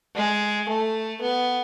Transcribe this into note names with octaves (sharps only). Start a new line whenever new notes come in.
G#3
A3
B3